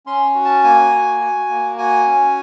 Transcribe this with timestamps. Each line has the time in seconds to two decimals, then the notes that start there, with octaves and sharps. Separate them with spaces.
0.06 C#4 C6
0.35 F#4
0.45 A5
0.64 A#3 G#5
0.92 F#4
1.21 F#4
1.49 A#3
1.78 F#4 G#5
2.06 C#4